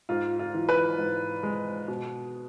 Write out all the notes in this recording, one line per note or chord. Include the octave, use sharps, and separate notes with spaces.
G#2 F4
F4
E3
B4
G#2
G#3
B2